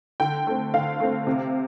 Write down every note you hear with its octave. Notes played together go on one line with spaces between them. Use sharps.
D3 G5
A3 C4
D3 F5
A3 C4
C3